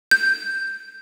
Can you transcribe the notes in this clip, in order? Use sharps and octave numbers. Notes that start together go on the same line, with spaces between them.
G6